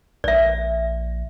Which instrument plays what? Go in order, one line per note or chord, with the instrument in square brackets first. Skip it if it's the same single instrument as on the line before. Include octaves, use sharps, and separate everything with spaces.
[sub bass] A#1 [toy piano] D5 E5